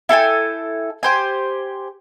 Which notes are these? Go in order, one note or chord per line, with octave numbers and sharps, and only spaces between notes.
E4 A4 G5 G#5
G4 C5 G#5